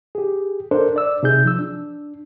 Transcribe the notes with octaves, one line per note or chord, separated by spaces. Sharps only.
G4 G#4
D4 A4 A#4 C5
D5 E6
C3 D#4 G#4 G6
F3 E6
D4